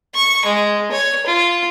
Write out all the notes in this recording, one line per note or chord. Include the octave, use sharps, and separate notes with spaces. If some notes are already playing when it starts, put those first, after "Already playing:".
C#6
G#3
C#5
F4